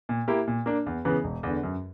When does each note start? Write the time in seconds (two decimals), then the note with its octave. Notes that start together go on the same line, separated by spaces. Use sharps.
0.09 A#2
0.28 A#3 E4 G4
0.47 A#2
0.66 A#3 D4
0.86 E2
1.05 C#3 E3 B3
1.24 E1
1.43 E2 D3
1.63 F#2